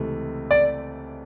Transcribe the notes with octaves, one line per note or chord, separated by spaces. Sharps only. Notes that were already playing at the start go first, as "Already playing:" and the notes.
Already playing: C#2 C3 E3 A3
D5